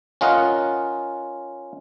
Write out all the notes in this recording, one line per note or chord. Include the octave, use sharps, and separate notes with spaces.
C#4 F4 A#4 D#5 F#5